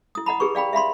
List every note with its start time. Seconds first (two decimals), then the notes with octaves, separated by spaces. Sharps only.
0.15 E4 D#6
0.26 D#5 F#5 A#5 B5
0.40 G4 G#4 B4 C#6
0.55 D5 F5 G5 B5
0.73 E5 F5 B5 C6